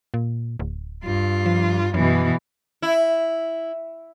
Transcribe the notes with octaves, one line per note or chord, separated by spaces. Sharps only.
A#2
D1
G2 F4
F3
F#2 B2 E3
E4